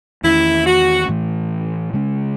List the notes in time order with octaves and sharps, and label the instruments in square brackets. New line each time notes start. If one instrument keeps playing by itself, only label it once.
[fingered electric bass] E2 D#3 A3 C#4 [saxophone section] E4
[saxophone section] F#4
[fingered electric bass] A2 E3 A3
C#3 G#3 C#4